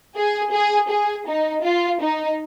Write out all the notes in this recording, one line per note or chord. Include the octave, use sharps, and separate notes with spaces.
G#4
G#4
G#4
D#4
F4
D#4